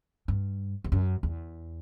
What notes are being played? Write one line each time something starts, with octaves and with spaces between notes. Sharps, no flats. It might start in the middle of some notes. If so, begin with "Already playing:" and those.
G2
E2
F#2
E2